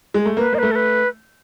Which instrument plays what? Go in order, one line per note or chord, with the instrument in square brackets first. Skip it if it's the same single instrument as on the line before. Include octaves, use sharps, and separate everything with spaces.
[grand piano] G#3
A3
[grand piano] A#3 [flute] B4
[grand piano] A#3 [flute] D#5
[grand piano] A3 [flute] B4
[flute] A4
B4